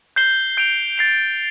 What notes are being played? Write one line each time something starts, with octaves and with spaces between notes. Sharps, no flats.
G6 C7 G7
G6 D7 F7
A6 C7 F7